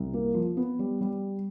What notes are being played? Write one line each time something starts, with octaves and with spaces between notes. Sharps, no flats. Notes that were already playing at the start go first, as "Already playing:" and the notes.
Already playing: C2
A#3
F3
B3
G3
G3